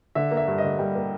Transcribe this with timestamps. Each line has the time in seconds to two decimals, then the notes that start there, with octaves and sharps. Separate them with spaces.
0.15 D3 E5
0.31 A#3
0.37 E5
0.48 G2
0.58 D#5
0.64 D3
0.79 G3
0.95 A#3